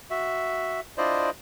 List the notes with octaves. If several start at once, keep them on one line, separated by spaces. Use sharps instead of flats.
F#4 E5
D4 E4 F4 C5 D5 D#5